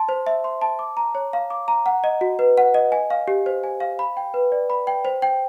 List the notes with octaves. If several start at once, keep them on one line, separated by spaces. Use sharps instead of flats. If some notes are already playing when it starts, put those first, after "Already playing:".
Already playing: A5 C6
C5
E5
C6
A5
D6
A#5
C#5
F5
D6
A#5
F#5
D#5
F#4
B4
F#5
D#5
G#5
F5
G4
C5
G#5
F5
B5
G5
B4
D5
B5
G5
C5
G5